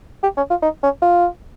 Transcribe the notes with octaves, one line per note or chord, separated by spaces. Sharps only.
G4
C#4
F4
D#4
C#4
F4